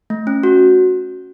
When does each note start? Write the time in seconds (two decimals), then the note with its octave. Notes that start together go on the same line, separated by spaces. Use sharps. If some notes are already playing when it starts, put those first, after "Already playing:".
0.10 A3
0.27 C#4
0.43 F#4